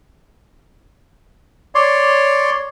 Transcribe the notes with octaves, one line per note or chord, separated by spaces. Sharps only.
C#5 D5 C6